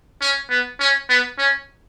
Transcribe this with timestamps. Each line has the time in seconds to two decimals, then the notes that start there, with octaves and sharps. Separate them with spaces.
0.21 C#4
0.49 B3
0.80 C#4
1.09 B3
1.38 C#4